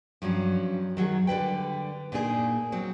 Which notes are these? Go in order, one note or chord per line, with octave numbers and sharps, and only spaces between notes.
G2 F3 F#3 C#4
D#3 F#3 G#4
D3 G3 B4 G5
A#2 A#3 D4 D#4 G#4
F#3 C4